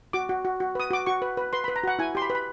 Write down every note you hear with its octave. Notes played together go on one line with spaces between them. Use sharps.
F#4 D6
F#4
F#4
F#4
B4 D#6
F#4 D6
F#4 C#6
B4
B4
B4 C6
B5
B4
A#5
F#4 F#5
E4 G#5
G4 C6
B5
B4
B5